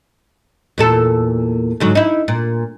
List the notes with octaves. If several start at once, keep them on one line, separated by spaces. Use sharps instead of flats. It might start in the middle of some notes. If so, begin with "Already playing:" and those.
E2 A#2 A4
G#2 D3 F#3
D#4 E4
A#2